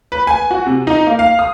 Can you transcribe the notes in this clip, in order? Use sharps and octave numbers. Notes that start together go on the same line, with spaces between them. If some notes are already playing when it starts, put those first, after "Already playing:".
B4
G#5
F#4
C3
D#4
A#3
F5
D#6